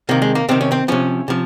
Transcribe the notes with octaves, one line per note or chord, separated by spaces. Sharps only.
C3 D#3 A#3
G#3
A#3
C3 D#3 C4
C#4
C4
C3 F3 C#4
C3 F3